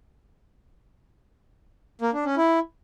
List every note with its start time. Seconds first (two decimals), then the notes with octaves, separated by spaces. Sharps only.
2.01 A#3
2.13 D4
2.25 C#4
2.37 E4